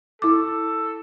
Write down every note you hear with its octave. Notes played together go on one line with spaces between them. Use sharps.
E4 A4 D6